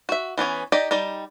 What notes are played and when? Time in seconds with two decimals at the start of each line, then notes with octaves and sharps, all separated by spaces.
0.09 F#4 E5
0.38 E3 B3 C#4 C#5
0.72 D#4 G4 D5 D#5
0.91 G3 D#4 D5